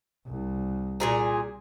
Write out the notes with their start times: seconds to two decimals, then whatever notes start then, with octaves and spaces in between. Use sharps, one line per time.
0.27 C2
1.00 A#2 G#4 A#5